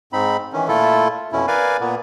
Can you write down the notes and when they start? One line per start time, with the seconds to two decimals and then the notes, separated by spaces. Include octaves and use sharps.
0.13 G#2 C4 D#4 B5
0.53 D#3 E3 C#4
0.68 A#2 A3 E4 F4 A4
1.32 F2 B2 C#4 E4
1.47 A#4 B4 D5 F5 G#5
1.80 A#2 A#3 B3